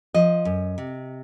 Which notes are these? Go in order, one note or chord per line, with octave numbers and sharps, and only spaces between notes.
F3 D#5
F#2
C3